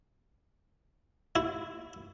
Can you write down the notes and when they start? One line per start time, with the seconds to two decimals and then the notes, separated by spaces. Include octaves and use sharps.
1.36 E4